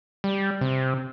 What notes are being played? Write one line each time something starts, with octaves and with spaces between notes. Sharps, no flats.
G3
C3